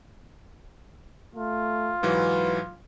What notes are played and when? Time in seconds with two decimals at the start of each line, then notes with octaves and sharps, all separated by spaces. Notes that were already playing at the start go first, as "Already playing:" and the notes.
1.35 A3 F4
2.03 G#2 E3 F#3 B4